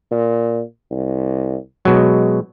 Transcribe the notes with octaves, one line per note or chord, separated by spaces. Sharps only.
A#2
C2
B2 F#3 G#3